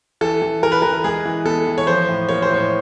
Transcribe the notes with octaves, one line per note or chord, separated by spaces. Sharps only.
E3 A4
E3
E3 A#4
B4
E3 A#4
G#3 G#4
E3
B3 A4
E3
C#5
F3 C5
A2
A#3 C#5
C5
A2 C#5